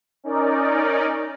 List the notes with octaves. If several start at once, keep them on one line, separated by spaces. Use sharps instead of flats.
C#4 D#4 A#4 D5